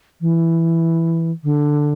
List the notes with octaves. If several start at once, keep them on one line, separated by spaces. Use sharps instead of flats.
E3
D3